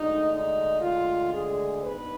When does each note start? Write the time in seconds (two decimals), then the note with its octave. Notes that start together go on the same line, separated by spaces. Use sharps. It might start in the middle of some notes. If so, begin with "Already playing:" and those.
Already playing: D2 D3 G#3 D#4
0.31 D#4
0.82 F4
1.32 G#4
1.83 D#2 D#3 B3 D4 B4